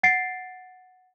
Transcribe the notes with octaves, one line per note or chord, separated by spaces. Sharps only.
F#5 A6 C7 D7